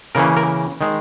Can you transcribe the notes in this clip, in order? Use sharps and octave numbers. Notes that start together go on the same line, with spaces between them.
C#3 E3 A#3 C#4 A#4
A#4
D#3 G#3